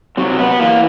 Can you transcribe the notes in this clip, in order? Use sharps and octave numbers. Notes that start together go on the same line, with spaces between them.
C3 F#3
B3
E3 A#3